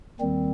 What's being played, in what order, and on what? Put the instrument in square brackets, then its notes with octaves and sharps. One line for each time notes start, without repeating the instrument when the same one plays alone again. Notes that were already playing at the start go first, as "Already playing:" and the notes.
[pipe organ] D#2 D#3 G3 C4